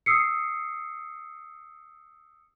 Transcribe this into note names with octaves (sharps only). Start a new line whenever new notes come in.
D#6 E6 C7 C#7